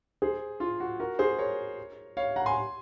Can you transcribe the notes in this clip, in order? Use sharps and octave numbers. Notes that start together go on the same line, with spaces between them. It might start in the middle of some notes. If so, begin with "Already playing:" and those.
G#4 C5
F4
F#4
F#4 A#4
G#4 C5
A#4 C#5
C#5 F5
F#5 A#5
G#5 C6